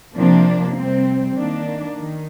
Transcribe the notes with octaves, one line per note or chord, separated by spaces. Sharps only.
C3 F3 A#3 D4
C3 G3 C4
D#3 A#3 D4
D#3